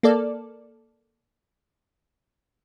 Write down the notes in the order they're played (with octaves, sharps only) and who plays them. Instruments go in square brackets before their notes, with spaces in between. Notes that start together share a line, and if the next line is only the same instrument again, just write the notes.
[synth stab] A#3 A4 D5